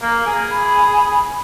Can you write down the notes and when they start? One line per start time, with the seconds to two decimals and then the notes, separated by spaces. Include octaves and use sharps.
0.02 A#3
0.26 G#4
0.52 B5